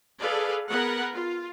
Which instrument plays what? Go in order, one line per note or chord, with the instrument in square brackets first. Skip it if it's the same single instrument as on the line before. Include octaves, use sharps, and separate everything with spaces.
[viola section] G#4 A4 B4 D5 F5
B3 G#4 A#4 B4 F#5
F4